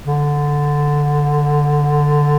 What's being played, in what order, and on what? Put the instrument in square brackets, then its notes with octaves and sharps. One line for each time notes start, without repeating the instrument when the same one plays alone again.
[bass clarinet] D3